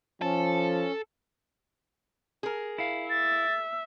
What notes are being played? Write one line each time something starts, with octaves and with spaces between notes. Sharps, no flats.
F3 C#4 A4
G#4 A#4
E4 F5
E5 A6